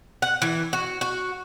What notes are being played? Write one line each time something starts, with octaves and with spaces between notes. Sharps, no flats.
F#5
E3
F#4
F#4